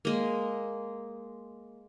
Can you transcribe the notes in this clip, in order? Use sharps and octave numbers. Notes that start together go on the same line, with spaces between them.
G#3 A#3